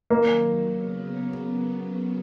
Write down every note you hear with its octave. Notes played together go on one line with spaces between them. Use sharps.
D#2 D#3 F#3 A#3
C#3 F#3 B3